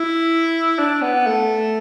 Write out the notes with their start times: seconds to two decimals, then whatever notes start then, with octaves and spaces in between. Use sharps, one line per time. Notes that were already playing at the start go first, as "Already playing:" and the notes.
Already playing: E4
0.79 D4
1.02 B3
1.27 A3